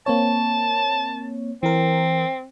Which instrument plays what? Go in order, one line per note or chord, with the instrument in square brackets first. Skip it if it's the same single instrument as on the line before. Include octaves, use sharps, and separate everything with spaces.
[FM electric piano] A#3 C4 C#5 [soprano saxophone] A5
[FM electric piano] E3 A#4 [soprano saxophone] C4